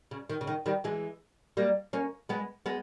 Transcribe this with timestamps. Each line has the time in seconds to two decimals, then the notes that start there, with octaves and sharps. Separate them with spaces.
0.11 C#3
0.30 D#3
0.41 C#3
0.47 D#3
0.66 D#3 G3
0.84 E3 G#3
1.57 G3 A#3
1.93 A#3 C#4
2.29 G#3 B3
2.66 G#3 B3